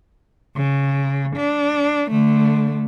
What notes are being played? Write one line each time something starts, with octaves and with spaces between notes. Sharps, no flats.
C#3
D4
D3 A3